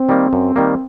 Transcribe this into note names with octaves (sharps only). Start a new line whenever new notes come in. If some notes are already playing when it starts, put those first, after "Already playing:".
Already playing: C4
D#3 G3 A#3
F#2
D#3 G3 A#3